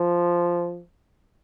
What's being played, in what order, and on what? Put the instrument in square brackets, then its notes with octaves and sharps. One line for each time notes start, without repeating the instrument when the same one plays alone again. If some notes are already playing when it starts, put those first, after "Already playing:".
Already playing: [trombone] F3